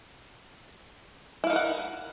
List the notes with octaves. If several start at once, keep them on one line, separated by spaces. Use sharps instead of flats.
D#4 E4 A#4 F5 F#5